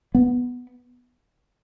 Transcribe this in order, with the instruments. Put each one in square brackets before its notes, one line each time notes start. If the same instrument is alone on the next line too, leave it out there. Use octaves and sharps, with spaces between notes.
[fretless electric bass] B3